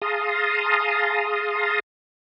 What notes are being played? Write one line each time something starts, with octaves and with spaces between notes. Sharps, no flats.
G#4 F5 A5 A#5 C6 D#6